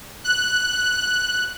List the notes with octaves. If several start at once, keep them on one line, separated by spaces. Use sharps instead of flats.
F#6